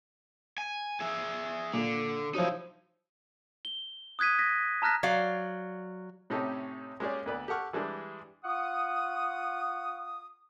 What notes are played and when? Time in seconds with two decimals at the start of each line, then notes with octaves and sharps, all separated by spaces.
0.58 G#5
1.01 G#4 E5
1.74 A#2 D3
2.35 F3 F#3 D#4 E4
3.65 G7
4.19 D#6 F#6 G#6 B6 D#7
4.39 A#6 B6
4.82 A5 A#5 F6 F#6 A#6 B6
5.03 F#3 D5 F5
6.30 A2 C3 C#4 D#4 G4 A4
7.00 G#3 A#3 C#4 G4 G#4 D5
7.26 D2 B3 B4 D5
7.48 G4 A4 F#5 C#6 F6
7.73 E3 G3 G#3 D4
8.44 F4 F#5 C#6 D#6